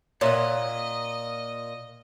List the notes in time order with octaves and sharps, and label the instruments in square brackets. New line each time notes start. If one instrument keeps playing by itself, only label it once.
[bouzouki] A#2 [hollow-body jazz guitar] C#5 E5 F#5 [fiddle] D#5